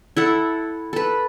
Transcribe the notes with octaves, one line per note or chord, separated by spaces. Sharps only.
E4 A4 F#5
A4 B4